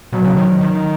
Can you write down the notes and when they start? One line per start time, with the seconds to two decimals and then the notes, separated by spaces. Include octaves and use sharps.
0.13 B2 F#3
0.24 C#3
0.37 D#3
0.61 D#3